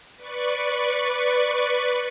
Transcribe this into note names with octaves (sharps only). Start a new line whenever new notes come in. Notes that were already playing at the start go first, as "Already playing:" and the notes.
B4 D5 C#6